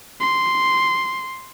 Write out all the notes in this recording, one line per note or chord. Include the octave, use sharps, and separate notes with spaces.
C6